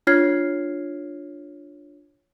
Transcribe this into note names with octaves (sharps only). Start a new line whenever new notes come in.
D4 F4 C#5 F6 G#6 C7